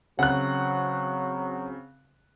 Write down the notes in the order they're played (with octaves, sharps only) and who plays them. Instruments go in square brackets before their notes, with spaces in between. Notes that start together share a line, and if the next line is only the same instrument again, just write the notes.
[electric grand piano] C#3 C4 [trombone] F#3 [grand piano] F#5 F#6